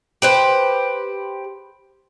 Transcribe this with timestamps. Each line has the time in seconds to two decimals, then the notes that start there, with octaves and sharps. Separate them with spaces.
0.22 G4 B4 C5